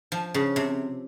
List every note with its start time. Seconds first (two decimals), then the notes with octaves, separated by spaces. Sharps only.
0.12 F3
0.34 C#3
0.56 C3